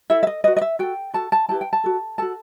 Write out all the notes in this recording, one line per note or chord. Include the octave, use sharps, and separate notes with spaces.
E4 A4 E5
E5
D#5
F#4 B4 D#5
D#5
E5
F#4 A4 G5
F#4 A4 A5
A5
E4 G4 B4 A5
G5
A5
F#4 A4
F#4 A4 A5